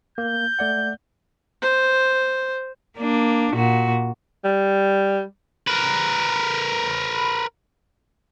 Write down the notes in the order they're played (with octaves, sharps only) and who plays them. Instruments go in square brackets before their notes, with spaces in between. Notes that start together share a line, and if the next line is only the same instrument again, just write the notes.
[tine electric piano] A#3 [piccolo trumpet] G6
[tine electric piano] A3 D5 F#5
[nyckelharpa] C5
[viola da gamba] A#3 D4
A#2 F#4
[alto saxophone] G3
[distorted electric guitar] A#4 B4